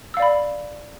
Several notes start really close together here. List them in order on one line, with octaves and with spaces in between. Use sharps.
E6 F5 D5 B5